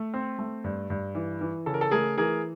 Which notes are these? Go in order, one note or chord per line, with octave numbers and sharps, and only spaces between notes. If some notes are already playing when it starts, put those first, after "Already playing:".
Already playing: A3
C4
A3
G2
G2
E3
E3
C#3 A4
A#4
A4
A3 G#4 A#4
E3 G#4 A#4